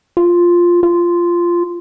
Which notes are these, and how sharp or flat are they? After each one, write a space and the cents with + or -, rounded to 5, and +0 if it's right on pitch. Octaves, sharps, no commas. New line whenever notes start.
F4 +0
F4 -10